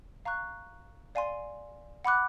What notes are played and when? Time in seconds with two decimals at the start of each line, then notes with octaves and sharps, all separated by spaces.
0.25 F5 A#5 C#6 F#6
1.15 D5 F5 G#5 C6
2.05 F#5 B5 D6 F#6